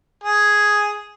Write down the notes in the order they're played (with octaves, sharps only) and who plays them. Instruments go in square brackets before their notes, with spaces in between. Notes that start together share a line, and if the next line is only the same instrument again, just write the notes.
[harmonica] G#4